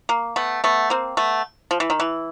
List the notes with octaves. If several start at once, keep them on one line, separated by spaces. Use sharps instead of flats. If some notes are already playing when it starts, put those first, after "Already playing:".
A#3
A3 B3
A3 B3
A#3 C4
A3 B3
F3
E3
D#3
E3